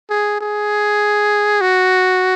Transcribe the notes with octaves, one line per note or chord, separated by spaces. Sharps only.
G#4
G#4
F#4